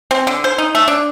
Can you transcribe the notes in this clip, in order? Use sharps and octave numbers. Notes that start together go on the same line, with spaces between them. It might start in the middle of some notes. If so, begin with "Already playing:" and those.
C4
D3
C5
D#4
A3
D4